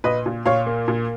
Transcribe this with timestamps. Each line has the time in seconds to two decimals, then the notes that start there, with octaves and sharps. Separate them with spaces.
0.04 A#2 B4 D#5
0.26 A#2
0.46 A#2 C#5 F5
0.66 A#3
0.88 A#2